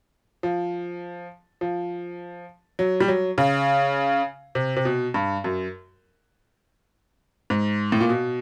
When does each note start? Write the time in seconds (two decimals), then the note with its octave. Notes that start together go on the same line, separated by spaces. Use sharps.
0.43 F3
1.61 F3
2.79 F#3
3.00 G3
3.08 F#3
3.38 C#3
4.55 C3
4.76 C3
4.85 B2
5.14 G2
5.44 F#2
7.50 G#2
7.92 A2
8.00 A#2
8.09 B2